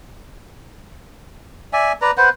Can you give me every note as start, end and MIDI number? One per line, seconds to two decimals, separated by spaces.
1.73 1.93 74
1.73 1.93 76
1.73 1.93 80
2.02 2.11 71
2.02 2.11 74
2.02 2.11 82
2.17 2.29 71
2.17 2.29 72
2.17 2.29 78